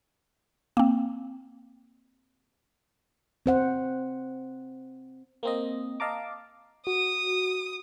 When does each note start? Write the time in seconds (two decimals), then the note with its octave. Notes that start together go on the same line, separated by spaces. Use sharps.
0.77 A#3 C4
3.46 C4 C5 F#5
5.43 A#3 C4 D#5
6.00 D#5 F5 A5 A#5 D6
6.87 F#4 D#6